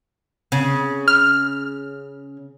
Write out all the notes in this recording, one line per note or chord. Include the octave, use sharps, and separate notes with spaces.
C#3
F6